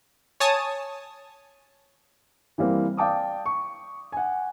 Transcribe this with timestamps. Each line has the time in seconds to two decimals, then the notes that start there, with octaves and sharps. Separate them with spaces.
0.40 C#5 G#5 A5 D#6
2.58 E3 G3 A#3 C4
2.97 D5 F5 G5 A5 D6 D#6
3.46 C#6
4.12 F#5 G#5